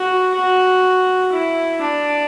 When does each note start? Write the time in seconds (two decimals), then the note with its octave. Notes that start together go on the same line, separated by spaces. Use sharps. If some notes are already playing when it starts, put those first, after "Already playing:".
Already playing: F#4
0.35 F#4
1.33 E4
1.82 D4